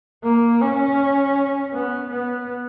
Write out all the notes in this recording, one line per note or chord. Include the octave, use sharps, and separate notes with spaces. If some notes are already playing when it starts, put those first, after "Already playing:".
A#3
C#4
B3
B3